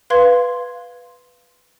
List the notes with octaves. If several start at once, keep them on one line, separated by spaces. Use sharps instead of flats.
B4 F5 C6 G#6